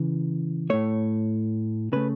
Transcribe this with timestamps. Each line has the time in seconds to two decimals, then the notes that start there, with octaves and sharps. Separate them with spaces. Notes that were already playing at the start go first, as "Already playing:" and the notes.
Already playing: C#3 E3
0.70 A2 A3 C#5
1.93 C#3 A3 B4